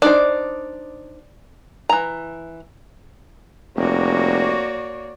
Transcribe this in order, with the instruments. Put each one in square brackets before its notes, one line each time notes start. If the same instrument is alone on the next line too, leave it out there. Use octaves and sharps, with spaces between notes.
[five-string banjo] D4 D#4 C5 [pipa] D5
[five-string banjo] E3 A#5
[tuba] F1 [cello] A#3 F#4 [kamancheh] C#5 D5